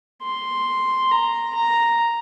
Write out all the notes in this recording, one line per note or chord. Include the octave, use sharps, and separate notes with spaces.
C6
A#5
A#5